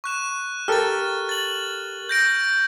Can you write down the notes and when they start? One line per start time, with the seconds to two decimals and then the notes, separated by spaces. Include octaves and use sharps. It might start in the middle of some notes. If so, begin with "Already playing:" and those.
0.04 C#6 F#6 E7
0.68 G4 A4 A#4 F6 A6
1.29 A6 F#7
2.09 G6 A#6 D7